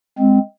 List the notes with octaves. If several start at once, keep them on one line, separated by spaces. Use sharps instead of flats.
G#3 C4